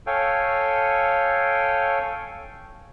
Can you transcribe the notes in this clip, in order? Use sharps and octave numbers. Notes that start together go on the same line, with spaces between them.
A4 C#5 F5 G5 G#5